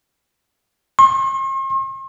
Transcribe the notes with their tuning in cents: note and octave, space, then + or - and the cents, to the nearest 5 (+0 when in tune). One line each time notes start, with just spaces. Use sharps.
C6 +45